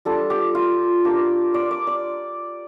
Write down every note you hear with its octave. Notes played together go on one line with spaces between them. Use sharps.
G3 D4 F4 A4
G4
F4
A#3 D4 F4 G4
D5
D5
D5